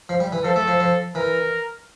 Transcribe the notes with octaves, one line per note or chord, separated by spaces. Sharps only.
F3
G3
E3
F3 A4
A3
F3
F3
E3 A#4